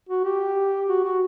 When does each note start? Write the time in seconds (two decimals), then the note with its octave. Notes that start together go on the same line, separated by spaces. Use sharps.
0.09 F#4
0.24 G4
0.89 F#4
1.04 F#4